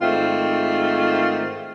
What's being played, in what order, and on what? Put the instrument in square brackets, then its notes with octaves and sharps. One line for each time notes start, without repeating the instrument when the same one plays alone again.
[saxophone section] G#2 D#3 A3 C4 F4